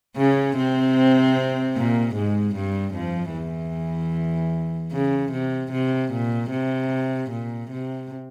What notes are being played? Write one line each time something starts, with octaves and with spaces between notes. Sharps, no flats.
C#3 C#4
C3 C4
A#2 A#3
G#2 G#3
G2 G3
F2 F3
E2 E3
C#3
C3
C3
A#2
C3
A#2
C3